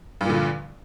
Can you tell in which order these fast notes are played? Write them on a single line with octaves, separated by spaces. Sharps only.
G2 A#2 D3 F3